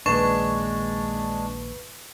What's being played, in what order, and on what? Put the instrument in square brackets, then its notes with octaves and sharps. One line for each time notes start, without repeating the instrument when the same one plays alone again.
[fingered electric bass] A#1 D#2 A#2 [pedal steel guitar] G#3 D4 [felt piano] B4 E7 [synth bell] C#6